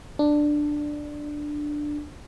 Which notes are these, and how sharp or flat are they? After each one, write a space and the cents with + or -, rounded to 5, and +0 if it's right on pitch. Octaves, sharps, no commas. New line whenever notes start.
D4 +10